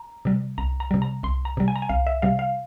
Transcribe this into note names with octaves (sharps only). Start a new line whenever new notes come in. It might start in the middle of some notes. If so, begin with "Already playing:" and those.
Already playing: A#5
C3 G3
C2 A#5
A#5
C3 G3
A#5
C2 C6
A#5
C3 G3
G#5
A#5
G#5
C2 F5
E5
C3 G3 F5
F5